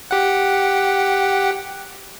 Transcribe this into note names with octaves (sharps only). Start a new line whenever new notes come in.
G4 F#5